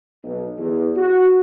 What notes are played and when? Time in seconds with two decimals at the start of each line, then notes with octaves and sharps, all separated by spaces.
0.24 B1
0.58 E2
0.97 F#4